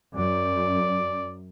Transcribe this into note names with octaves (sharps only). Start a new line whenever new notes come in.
F#2 D5